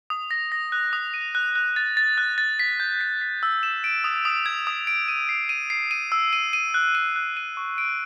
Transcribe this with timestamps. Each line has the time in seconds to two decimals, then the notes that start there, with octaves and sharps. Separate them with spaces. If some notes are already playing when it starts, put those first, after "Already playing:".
0.10 D#6
0.31 A#6
0.52 A#6
0.72 F#6
0.93 D#6
1.14 D#7
1.35 F#6
1.56 F#6
1.76 A6
1.97 A6
2.18 F#6
2.38 A6
2.59 B6
2.80 G6
3.01 B6
3.21 B6
3.43 E6
3.63 E7
3.84 D7
4.04 D#6
4.25 D#6
4.46 G#6
4.67 D#6
4.87 D7
5.08 D#7
5.29 C7
5.49 D#7
5.70 C7
5.91 D#7
6.12 E6
6.33 D#7
6.53 D#7
6.74 F#6
6.95 D#7
7.16 F#6
7.37 D#7
7.57 C#6
7.78 D7